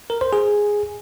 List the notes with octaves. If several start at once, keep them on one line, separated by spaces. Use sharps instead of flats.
A#4
C5
G#4